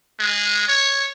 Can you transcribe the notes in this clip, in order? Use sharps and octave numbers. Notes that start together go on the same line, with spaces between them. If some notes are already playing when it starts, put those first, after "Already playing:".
G#3
C#5